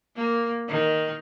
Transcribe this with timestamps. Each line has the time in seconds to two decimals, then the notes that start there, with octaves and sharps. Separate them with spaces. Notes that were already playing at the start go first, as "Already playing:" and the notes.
0.16 A#3
0.68 D#3